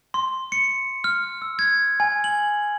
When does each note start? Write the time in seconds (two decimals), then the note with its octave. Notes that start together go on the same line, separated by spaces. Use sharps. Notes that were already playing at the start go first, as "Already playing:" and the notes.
0.14 C6
0.52 C#7
1.04 F6
1.42 E6
1.59 G#6
2.00 G#5
2.24 F#7